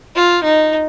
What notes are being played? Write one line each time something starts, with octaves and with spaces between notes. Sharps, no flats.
F4
D#4